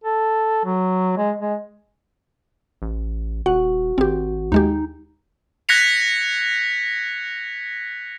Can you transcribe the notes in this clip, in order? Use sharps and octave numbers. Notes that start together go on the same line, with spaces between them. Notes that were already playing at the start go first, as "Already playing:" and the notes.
A4
F#3
G#3
G#3
A1
D#1 F#4 F#5
G#1 C4 G4
D#2 G#3 D#4 G4
F#6 G#6 A#6 B6 C#7 F7